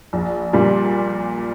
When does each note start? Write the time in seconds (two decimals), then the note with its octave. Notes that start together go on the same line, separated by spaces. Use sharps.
0.13 A#1
0.53 A#2 G3